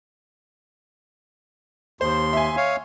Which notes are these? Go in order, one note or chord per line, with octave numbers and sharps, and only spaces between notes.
D#2 C5 C6
E5 G#5
C#5 F5